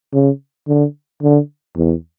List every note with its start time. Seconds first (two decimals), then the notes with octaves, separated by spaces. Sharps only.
0.14 C#3
0.68 D3
1.22 D3
1.77 E2